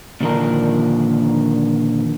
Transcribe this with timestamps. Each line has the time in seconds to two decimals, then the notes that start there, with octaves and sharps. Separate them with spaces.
0.21 A#2 D3 D#3 F3 D4 A#4